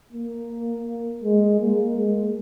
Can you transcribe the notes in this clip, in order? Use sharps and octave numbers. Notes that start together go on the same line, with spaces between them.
A#3
G#3
A#3
G#3